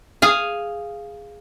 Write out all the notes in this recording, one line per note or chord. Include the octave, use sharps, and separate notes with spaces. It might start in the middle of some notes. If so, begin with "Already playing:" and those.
G#4 F5